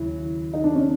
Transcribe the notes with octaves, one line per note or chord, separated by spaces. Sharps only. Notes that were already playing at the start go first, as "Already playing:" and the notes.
Already playing: D#2 C#3 F#3 E4
D#4
D4
C#4